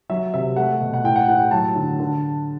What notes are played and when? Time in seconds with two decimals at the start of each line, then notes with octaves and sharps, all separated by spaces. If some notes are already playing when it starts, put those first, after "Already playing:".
0.09 F#3 E5
0.34 C3 E5
0.56 A3 F#5
0.81 B2
0.94 F#5
1.04 A2 G5
1.16 F#5
1.28 A2 F#5
1.40 G5
1.51 F#3 A5
1.76 D3
2.00 D3